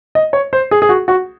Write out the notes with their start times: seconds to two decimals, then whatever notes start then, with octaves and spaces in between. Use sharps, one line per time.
0.15 D#5
0.33 C#5
0.53 C5
0.71 G#4
0.82 G#4
0.89 F#4
1.08 F#4